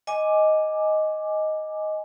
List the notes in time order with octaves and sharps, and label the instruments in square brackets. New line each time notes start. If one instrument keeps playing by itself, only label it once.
[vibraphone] D#5 G#5 D6